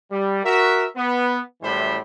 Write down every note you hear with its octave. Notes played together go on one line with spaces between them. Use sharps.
G3
F#4 A#4 E5
B3
F#2 A2 E3 G3 C5 B5